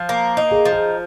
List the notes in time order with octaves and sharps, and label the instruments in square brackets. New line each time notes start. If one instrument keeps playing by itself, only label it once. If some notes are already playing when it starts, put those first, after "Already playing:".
Already playing: [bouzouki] F3
A#3
D#4
[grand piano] G#4
[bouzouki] F3
[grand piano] G#4